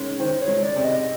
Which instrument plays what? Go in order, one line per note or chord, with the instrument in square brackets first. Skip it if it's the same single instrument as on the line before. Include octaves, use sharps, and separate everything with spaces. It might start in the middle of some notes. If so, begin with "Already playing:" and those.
Already playing: [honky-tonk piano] D#3 G#3 C#4
[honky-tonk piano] D#3 [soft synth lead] C5
[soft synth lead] C#5
[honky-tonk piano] G#3
[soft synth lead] D5
[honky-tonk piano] C3 [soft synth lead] D5
[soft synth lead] D#5